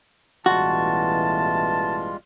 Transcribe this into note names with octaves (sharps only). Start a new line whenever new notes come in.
A1 B2 E3 G3 G#3 F4 F#4 A5